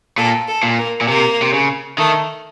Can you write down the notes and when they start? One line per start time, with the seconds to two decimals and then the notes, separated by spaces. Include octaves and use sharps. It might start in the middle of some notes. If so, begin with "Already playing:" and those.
0.18 A#2 A4
0.48 A4
0.63 A#2
0.79 A#3
1.01 A#2
1.08 C3 A#3
1.42 C3
1.54 C#3
1.98 D#3 A3